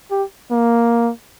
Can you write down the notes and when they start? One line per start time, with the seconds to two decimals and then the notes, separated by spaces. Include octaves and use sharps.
0.11 G4
0.51 A#3